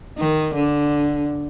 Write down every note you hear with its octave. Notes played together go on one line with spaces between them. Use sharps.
D#3
D3